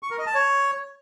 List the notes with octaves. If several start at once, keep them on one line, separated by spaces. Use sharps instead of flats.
C#6
A#4
D#5
A5
C#5